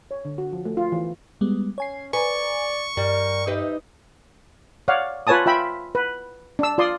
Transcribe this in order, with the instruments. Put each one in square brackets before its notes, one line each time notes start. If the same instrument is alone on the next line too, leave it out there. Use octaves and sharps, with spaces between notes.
[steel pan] C#5
D3
F#4
F3
A3
F4
E3
[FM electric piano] G3 G#3 B3
[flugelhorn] C#4 [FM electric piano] C#5 G#5 C7
[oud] B4 [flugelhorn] D5 [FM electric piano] G#5 A#5 [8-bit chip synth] C#6
[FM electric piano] G2 [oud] G3 [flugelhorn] A#4
[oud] D#4 G4 B4 [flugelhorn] E5
[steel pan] C#5 D5 F5 F#5
F4 B4 C#5 G#5 A5 D#6
F4 E5 G5 B5
B4
D4 E6
F4 D5 C6 D#6